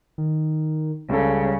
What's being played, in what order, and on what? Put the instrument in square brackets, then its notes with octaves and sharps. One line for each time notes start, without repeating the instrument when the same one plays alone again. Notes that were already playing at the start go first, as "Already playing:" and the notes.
[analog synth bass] D#3
[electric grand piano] C#2 A4 [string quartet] C#3 [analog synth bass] G3